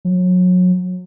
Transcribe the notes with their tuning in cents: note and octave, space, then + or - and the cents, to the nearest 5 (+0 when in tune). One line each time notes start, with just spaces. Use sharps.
F#3 -30